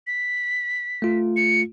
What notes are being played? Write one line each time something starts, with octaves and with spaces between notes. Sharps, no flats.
B6
A3 F4
C#7